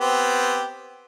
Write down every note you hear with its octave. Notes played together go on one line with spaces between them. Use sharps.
B3 C4 G4